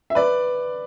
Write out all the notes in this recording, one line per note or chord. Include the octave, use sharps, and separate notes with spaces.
E5
B4 D5